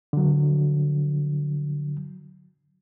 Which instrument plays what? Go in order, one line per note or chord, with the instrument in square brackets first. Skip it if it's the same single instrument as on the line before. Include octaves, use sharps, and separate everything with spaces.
[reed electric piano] D3 F#3